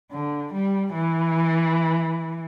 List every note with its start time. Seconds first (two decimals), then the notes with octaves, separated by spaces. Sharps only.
0.11 D3
0.53 G3
0.94 E3